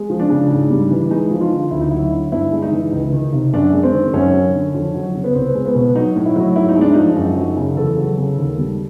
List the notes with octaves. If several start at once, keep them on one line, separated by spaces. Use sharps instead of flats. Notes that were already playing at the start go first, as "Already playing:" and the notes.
Already playing: G#3
F3
D4
C#3
G#2
G3
E3
G#3 D#4
F3
F4
D3
D2 E4
D#4
F#3 E4
D3
G2 E4
G#3
D#4
E3
C#2
D#3
C3
F#2 D4
G#3
C4
D#3
F#2 C#4
F#3
D3
F2
F#3
C#3
B3
C2 C4
G#3
B3
B2
F#3 D#4
A2
E4
F#3
G#2 E4
D#4
G#3
D4
F3 D#4
F#2
F#3
C#3
E2 A4
F#3
C#3
D#2
G3